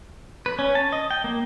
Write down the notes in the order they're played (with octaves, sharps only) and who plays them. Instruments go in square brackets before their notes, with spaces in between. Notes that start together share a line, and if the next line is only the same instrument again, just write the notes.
[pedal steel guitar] B4
C#4
A5
D#5
G5
A#3